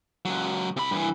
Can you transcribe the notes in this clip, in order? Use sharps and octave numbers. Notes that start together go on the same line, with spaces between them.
C#2 F#3
C3 B5
G2 E3